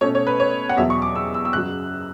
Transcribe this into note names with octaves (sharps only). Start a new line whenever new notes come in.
B2 A3 C#4 C#5
C#5
B4
C#5
F#5
E2 B2 F#3 E5
C#6
D6
E6
E6
E6
F#2 C#3 F#3 F#6